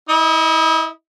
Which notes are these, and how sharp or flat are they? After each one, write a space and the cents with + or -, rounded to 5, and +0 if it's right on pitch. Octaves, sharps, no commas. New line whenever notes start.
E4 -35 D#5 +0